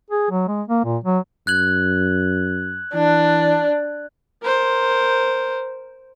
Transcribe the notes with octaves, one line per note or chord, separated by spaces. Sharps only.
G#4
F#3
G#3
A#3
A#2
F#3
F#2 F#6 G#6 F#7
E3 D4
A#4 C5